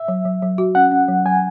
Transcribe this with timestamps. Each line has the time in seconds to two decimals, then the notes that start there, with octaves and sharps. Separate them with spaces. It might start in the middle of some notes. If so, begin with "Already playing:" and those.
Already playing: E5
0.08 F#3
0.25 F#3
0.42 F#3
0.58 F#4
0.75 C#4 F#5
0.92 C#4
1.08 F#3
1.25 F#3 G#5